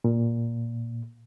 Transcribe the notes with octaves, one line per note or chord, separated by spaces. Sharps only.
A#2